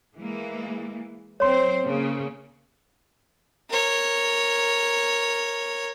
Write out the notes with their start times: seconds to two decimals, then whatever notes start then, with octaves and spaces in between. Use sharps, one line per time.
0.16 E3 G#3 A#3
1.40 F#3 C4 C5 C#5 C6
1.82 C#3 A#3
3.69 A#4 C#5